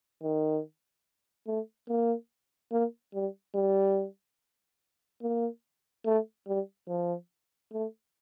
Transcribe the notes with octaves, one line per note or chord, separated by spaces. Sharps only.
D#3
A3
A#3
A#3
G3
G3
A#3
A3
G3
F3
A3